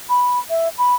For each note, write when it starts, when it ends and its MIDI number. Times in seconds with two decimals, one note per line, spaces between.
0.10 0.39 83
0.50 0.69 76
0.78 0.95 83